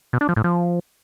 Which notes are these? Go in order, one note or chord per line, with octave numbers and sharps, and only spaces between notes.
B2
D4
F3
A2
F3